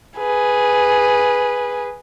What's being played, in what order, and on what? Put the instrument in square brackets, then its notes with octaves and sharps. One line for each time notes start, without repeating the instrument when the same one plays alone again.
[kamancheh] G#4 B4